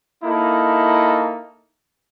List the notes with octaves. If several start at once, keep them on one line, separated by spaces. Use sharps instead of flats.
A#3 D#4 E4 A4